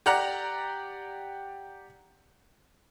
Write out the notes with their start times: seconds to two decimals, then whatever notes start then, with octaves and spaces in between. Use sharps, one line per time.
0.06 G4 D5 F#5 A#5 F#6